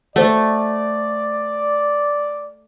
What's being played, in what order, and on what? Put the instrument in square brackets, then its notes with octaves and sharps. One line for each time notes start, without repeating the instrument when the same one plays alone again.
[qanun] A3 [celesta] C5 F#5 [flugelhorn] D5